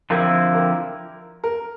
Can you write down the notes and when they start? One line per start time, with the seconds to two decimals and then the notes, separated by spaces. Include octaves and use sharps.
0.10 D3 F3 C4 E4 A#4
0.55 A#4
1.44 A#4